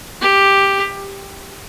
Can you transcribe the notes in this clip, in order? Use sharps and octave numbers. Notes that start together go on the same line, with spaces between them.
G4